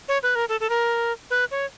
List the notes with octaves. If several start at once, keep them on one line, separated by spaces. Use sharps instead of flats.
C#5
B4
A#4
A4
A4
A#4
B4
C#5